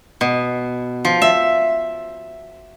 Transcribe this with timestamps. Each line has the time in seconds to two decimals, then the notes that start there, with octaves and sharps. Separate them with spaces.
0.21 B2
1.05 F3
1.22 E5